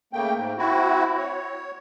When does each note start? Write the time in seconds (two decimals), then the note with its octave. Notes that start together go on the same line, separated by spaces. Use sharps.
0.13 C#3 A3 A#3 G5
0.36 G#2
0.58 C4 E4 F#4
1.18 C#5